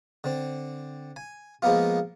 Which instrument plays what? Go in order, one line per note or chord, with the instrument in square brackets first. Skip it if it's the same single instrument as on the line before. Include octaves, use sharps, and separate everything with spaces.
[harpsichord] D3 C4
G#5
F3 G#3 A#3 B3 F4